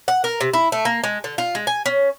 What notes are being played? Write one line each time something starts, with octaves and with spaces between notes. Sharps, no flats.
F#5
A#4
C3
E4
A3
A#3
G#3
D3
F4
G#3
G#5
C#4